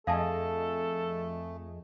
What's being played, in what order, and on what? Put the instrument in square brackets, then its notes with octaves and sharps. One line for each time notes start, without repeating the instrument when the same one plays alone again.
[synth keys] F2 G#4 D#5 [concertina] A3 [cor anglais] A4 [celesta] F5 A5